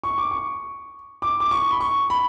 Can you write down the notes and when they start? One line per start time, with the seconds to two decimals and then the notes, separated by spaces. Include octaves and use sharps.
0.04 C#6
0.18 D6
0.31 C#6
1.22 D6
1.40 D6
1.51 C#6
1.71 B5
1.81 C#6
2.10 B5